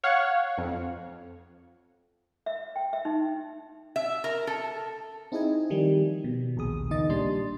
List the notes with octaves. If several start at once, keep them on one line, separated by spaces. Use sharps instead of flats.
C#5 F5 F#5
F2
E5
G5
E5
D#4
E5
A#4
A4
C4 D#4 E4 G#4 D#5 G#5
D#3 F3 G3
B2
A#1 D#2 G#4 D#6
C#2 D#3 D#4 D#5 A6
A#2 G3 D4 C6 A6